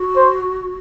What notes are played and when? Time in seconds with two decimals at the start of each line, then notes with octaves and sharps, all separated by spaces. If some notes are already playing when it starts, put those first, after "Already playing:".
Already playing: F#4
0.16 C5